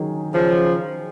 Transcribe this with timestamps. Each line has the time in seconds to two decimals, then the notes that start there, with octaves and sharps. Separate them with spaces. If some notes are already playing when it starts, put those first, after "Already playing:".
Already playing: D#3 F#3 C#4 G#4
0.34 C#3 F3